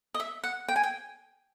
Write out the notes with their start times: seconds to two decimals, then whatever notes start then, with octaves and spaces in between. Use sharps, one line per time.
0.14 D#5
0.20 E5
0.44 F#5
0.68 G5
0.76 G#5
0.83 G5